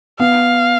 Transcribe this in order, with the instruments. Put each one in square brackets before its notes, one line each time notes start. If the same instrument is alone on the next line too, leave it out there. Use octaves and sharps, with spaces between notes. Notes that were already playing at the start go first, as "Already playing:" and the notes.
[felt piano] B3 [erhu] F5